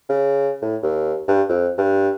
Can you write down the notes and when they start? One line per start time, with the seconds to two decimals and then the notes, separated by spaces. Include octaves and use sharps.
0.09 C#3
0.62 A2
0.82 D#2
1.28 G2
1.49 F2
1.77 G2